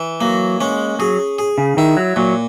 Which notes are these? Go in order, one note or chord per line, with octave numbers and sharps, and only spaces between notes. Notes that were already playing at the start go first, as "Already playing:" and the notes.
Already playing: E3
F#3 A#3
G#3 C#4
F#3 G#4
G#4
C#3
D#3 E4
F#3
A#2 F#3